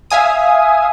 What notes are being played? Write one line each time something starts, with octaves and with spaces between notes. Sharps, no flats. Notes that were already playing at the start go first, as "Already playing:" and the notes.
E5 F5 G#5 D#6